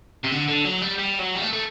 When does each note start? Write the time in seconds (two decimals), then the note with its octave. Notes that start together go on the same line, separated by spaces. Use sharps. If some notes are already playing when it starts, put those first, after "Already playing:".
0.24 C3
0.32 D3
0.49 D3
0.65 F#3
0.82 G3
0.99 G3
1.19 F#3
1.35 G3
1.42 A3
1.53 A3